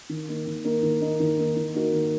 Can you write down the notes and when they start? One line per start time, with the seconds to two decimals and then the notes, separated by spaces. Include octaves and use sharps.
0.09 D#3
0.28 A#3 D#4
0.47 D#3
0.65 A#3 D#4
0.83 D#3
1.01 A#3 D#4
1.20 D#3
1.39 A#3 D#4
1.56 D#3
1.74 A#3 D#4 F#4 A#4
1.93 D#3